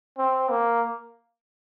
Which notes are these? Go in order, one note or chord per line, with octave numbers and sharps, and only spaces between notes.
C4
A#3